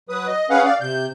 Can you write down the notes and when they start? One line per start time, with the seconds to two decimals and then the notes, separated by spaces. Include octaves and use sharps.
0.09 F#3 B4 D#6
0.27 D#5
0.50 C#4 G#4 B4 F5 F#5
0.65 D5 F5
0.81 C3 G6